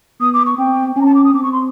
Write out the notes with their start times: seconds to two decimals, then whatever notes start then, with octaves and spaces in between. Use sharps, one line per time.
0.20 B3 D#6
0.34 D6
0.46 C#6
0.58 C4 G5
0.96 C#4 G#5
1.01 A#5
1.06 A5
1.15 D6
1.25 D#6
1.34 C4 D6
1.43 C#6
1.52 C6